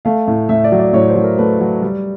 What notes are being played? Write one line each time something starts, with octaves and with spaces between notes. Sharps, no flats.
A3 F5
A2
A2 E5
D5
F#3
D5
A2 C#5
C5
F#3
A#4
A3 B4
F#3
G3